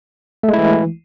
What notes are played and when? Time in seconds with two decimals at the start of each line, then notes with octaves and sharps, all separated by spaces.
0.43 A3
0.48 G#3
0.53 E4
0.58 E3